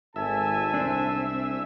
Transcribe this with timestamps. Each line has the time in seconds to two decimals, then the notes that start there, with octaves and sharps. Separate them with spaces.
0.16 G#1 A4 E5 G#5 A5
0.74 C2 C4 D4